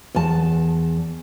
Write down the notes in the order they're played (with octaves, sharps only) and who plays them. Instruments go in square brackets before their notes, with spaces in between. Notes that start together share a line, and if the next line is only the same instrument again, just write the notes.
[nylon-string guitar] E2 A5